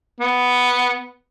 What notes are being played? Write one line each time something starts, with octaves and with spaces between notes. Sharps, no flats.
B3